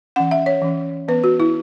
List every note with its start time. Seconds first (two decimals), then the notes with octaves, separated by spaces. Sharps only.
0.16 E3 C#4 F#5
0.31 E5
0.46 C#5
0.62 E3 C#4
1.08 E3 B3 B4
1.24 F#4
1.40 E4